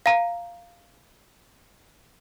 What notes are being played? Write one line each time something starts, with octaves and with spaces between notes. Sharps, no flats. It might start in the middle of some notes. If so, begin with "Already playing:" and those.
F5 A#5